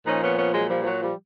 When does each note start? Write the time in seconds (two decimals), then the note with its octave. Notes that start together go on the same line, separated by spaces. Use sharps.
0.06 A#2 F3 C#4 D#4
0.23 B3 C#4
0.38 B3 C#4
0.54 F#3 G#3
0.70 F3 G3
0.83 F3
0.86 F#3
1.02 F3 G3